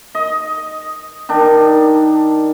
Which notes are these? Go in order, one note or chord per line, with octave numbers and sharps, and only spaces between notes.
D#5
D#3 D4